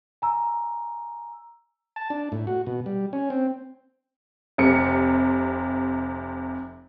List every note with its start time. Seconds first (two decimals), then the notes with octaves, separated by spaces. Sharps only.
0.22 G#5 A#5 E6
1.96 A5
2.10 D4
2.32 A2
2.47 F#4
2.67 B2
2.86 G3
3.13 C#4
3.30 C4
4.58 F1 C3 C#7